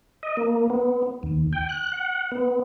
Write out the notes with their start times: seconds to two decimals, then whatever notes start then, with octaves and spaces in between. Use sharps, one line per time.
0.23 D#5
0.37 A#3
0.70 B3
1.23 D#2
1.53 G5
1.69 F#6
1.92 F#5
2.32 B3